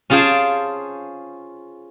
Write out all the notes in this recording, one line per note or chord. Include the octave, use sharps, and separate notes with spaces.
C#4 F4 G#4 C5 G5 A5